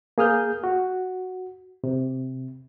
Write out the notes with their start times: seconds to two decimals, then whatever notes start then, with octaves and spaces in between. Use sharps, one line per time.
0.18 A#3 G#4 D#6 F6 G6
0.64 F#4
1.84 C3